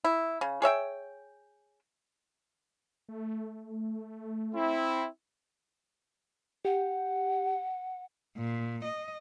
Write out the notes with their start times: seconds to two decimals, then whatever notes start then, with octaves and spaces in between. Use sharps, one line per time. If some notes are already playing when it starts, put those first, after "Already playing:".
0.04 E4
0.41 C#3
0.62 G#4 C#5 E5 G5
3.08 A3
4.55 C4 E4
6.65 G4 F#5
8.37 A#2
8.84 D#5